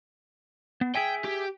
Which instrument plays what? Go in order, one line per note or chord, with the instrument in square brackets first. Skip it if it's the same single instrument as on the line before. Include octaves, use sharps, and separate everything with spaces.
[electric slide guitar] B3
[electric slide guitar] G#4 E5 G#5 [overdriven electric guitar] G5
[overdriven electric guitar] G4